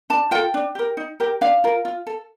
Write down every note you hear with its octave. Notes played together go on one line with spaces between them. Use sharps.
D4 A5
F4 A4 G5
D4
G4 A#4
D#4
G4 A#4
D4 F5
F4 A#4
F4
A4